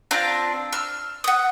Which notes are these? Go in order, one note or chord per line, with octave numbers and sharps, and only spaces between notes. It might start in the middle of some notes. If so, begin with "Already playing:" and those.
C4 D4 F4 A#5
E6 F6
F#5 D#6